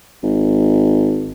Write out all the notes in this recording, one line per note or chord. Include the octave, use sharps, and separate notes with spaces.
G#1